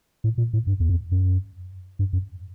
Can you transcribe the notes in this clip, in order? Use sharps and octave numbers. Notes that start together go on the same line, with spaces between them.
A2
A#2
A2
G2
E2
F2
F#2
G2
F#2